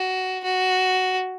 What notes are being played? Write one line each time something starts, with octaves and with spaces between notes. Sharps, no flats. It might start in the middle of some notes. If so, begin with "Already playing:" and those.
Already playing: F#4
F#4